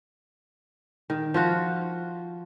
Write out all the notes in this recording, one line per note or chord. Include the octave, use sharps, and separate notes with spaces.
D#3
F3 F4 F#4